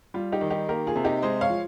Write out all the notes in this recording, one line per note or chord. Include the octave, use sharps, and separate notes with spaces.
G3 F4
D#4 G4
D#3
D#4 G4
A#3 G4 A#4
F4 G#4
C3
D#4 G4
G#3 C5 D#5
C#5 F5
F3